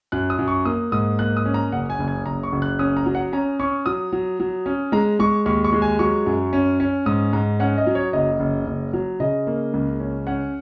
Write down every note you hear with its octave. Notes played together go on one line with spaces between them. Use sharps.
F#2 F#6
D#6
F#2
C#6
A#3 D#6
G#2 D#6
A#3 F#6
D#6
C#4
A#5
F#1 F#5
G#5
F#1
G#5
F#1 A#5
C#6
F#1
F#6
C#4 D#6
A#5
F#3
F#5
C#4 A#5
C#4 C#6
F#3 D#6
F#3
F#3
C#4
G#3 A#5
G#3 C#6
D#2 C#6
C#6
G#3
G#5
F#3 C#6
F#2
C#4
C#4
G#2 D#6
G#2 A#5
C#4 F#5
D#5
F#3
C#5
F#1 D#5
F#1
F#1
F#3
C#3 D#5
A#3
C#2
C#4
C#4 F#5